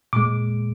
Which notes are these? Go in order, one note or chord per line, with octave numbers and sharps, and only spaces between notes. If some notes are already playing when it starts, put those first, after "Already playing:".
A#2 G#3 D6